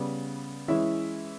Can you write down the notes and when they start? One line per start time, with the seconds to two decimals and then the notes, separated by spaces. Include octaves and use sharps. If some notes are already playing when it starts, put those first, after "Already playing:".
Already playing: C#3 G3 B3
0.68 E3 G#3 C#4 E4 E5